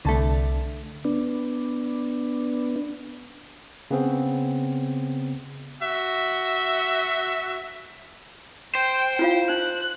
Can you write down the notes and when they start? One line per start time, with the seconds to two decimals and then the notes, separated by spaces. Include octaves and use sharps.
0.05 C2 D3 A3 D4 A5
1.05 B3 D4
3.91 C#3 B3 C4
5.82 F#4 E5
8.75 C5 G5
9.19 E4 F4 F5
9.49 D#4 F#6